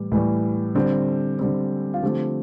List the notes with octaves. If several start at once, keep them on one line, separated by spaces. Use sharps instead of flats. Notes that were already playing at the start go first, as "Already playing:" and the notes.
Already playing: A2 E3 G3
A2 E3 G3
D3 G3 C4
D3 G3 C4
F4
D3 F3 A3 C4 G4